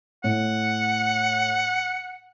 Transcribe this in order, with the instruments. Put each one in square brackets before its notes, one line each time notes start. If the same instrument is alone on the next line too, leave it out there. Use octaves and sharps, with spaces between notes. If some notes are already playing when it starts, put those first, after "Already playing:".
[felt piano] A2 [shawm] F#5